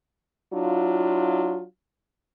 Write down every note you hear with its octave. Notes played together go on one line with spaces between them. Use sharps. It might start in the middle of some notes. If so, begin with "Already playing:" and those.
F#3 D4 E4 F4